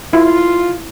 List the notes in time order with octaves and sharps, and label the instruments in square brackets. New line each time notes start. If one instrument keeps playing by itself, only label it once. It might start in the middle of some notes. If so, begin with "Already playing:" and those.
[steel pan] E4 [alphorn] F4